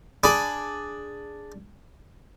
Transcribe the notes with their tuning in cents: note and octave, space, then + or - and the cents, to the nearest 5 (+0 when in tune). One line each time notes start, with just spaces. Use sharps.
D4 +0 G#4 +0 B5 +0